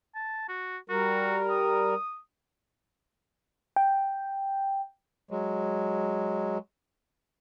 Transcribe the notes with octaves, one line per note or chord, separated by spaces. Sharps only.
A5
F#4
G3 F#4 A#4
D#6
G5
F#3 G#3